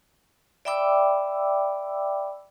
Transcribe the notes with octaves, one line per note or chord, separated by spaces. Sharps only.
D5 E5 G5 B5 D6 E6